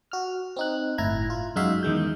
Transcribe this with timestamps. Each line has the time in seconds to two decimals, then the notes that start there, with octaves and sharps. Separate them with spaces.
0.12 F#4 F6
0.56 C4 D#4 F#6
0.98 G1 A2 E4 A#5 G#6
1.30 F4
1.56 F#2 G#3 D#4 F#4 E5 F5
1.83 E2 D#3 G#3 G6